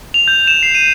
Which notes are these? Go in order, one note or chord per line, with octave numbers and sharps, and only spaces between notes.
F7
G6
E7
C7
D#7